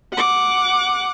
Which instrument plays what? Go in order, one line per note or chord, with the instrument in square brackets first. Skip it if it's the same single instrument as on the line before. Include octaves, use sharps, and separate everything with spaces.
[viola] F#5 D6